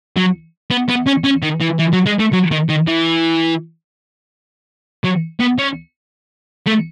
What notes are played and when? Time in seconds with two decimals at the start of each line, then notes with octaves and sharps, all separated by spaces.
0.17 F#3
0.70 B3
0.89 B3
1.07 C#4
1.24 C#4
1.42 D#3
1.60 E3
1.79 E3
1.93 F#3
2.06 G#3
2.19 A3
2.33 F#3
2.52 D#3
2.69 D#3
2.88 E3
5.05 F#3
5.40 B3
5.58 C#4
6.67 A3